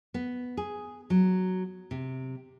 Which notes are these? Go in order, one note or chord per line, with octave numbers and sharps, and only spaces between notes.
B3
G#4
F#3
C3